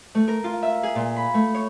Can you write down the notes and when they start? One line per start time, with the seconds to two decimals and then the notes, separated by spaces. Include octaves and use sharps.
0.15 A3
0.28 A#4
0.44 F4
0.63 E5
0.83 G#4
0.95 A#2
1.16 B5
1.34 A3
1.55 C#5